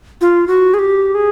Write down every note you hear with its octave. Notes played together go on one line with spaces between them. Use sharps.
F4
F#4
G#4
G4
G#4